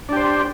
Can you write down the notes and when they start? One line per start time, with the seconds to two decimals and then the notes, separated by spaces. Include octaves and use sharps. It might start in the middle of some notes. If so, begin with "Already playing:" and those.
0.09 D4
0.13 G4
0.16 C5